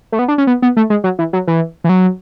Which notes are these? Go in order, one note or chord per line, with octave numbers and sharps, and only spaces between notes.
A3
B3
D4
C#4
B3
B3
A3
G#3
F#3
E3
F#3
E3
E3
F#3